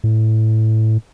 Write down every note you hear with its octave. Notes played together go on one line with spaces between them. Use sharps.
A2